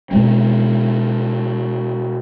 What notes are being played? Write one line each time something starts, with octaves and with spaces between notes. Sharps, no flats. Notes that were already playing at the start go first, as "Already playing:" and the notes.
B2 G#3 C4